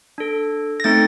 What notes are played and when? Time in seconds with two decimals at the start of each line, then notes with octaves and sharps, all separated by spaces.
0.18 D4 A4
0.80 A#6
0.84 A3 C4 D#4 A4 A6